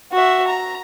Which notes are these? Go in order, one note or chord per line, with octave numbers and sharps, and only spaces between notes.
F#4 E5
A#5